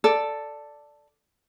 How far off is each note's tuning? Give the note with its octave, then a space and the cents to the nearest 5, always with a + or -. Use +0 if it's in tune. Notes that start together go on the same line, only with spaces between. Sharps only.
A4 +5 D5 +0